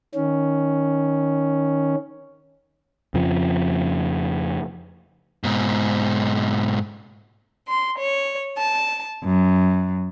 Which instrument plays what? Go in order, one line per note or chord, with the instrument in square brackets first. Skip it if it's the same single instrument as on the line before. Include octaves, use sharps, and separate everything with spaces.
[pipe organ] D#3 C#4
[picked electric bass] F2 C#3 F3
[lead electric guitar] G#2 B2
[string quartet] C6
C#5
A5
F#2